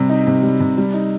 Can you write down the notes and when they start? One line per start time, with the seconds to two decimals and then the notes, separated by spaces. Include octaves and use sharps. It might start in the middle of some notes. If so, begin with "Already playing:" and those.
Already playing: C3 G3
0.09 D#4
0.27 C3
0.43 G3
0.60 C3
0.77 G3
0.94 D#4